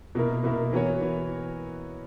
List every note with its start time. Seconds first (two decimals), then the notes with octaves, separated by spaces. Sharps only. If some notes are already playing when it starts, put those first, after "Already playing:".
0.15 B2 A#3 E4 A#4
0.44 B2 A#3 E4 A#4
0.73 E3 B3 F#4 A#4 C#5
1.01 E3